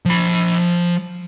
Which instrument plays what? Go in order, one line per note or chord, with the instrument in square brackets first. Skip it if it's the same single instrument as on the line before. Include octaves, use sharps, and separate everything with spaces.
[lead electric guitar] F3 B5